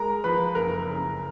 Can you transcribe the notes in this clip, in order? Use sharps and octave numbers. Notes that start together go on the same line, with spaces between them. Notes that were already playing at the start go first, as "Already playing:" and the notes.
Already playing: G#3 A#4 A#5
F3 B4 B5
F#1 A#4 A#5
C#3